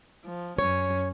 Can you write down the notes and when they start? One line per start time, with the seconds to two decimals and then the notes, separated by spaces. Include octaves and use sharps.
0.24 F3
0.59 F#2 C#4 C#5